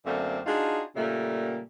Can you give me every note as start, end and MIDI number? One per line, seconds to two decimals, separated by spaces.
0.05 0.39 42
0.05 0.39 50
0.05 0.39 57
0.05 0.39 58
0.05 0.39 60
0.46 0.82 62
0.46 0.82 63
0.46 0.82 65
0.46 0.82 66
0.46 0.82 68
0.96 1.61 46
0.96 1.61 49
0.96 1.61 55
0.96 1.61 57
0.96 1.61 58